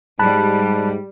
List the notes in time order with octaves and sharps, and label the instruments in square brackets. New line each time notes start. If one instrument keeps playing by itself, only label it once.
[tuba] G#2 [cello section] G3 [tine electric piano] A5 B5 F#6